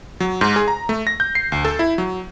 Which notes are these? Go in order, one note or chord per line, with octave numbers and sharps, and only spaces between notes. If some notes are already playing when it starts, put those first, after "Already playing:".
F#3
G#2
G#4
A#5
A3
A#6
G6
C7
D2
A4
E4
F#3